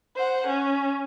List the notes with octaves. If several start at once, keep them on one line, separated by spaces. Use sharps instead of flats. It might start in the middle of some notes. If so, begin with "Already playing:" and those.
C5 F#5
C#4